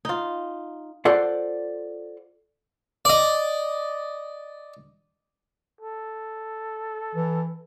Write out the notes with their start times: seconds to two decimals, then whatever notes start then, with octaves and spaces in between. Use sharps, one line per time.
0.05 D#4 F4
1.05 F4 A4 C5 D5 F#5
3.05 D5 D#5
5.81 A4
7.15 E3